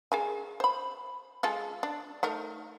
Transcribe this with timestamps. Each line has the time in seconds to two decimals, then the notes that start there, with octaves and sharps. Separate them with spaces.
0.12 G#4 A#4 G#5
0.60 C5 B5
1.43 G#3 F4 A4
1.83 D4
2.23 A3 D#4 A#4